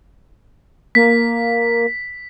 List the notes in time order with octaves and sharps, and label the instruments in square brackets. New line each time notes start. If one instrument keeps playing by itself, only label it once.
[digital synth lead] A#3 [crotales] B6